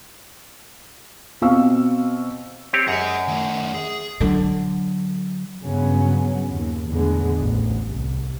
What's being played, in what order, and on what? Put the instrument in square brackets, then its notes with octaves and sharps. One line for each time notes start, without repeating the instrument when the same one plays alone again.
[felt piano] B2 C4 F5 C#6 E6
[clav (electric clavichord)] C4 G4 C#5
[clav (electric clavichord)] F#2 [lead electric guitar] G#4 D#5
[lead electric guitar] D#3 A3
G#4
[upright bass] D3 F#3
[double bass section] G2 C#3 F#3 B3 C#4
D#2
E2 A2 D3 G#3 B3
A1 D2
C2